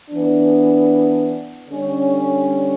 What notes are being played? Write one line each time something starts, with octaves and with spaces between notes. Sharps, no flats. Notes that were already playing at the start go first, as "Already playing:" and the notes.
E3 B3 D4
D3 G3 C#4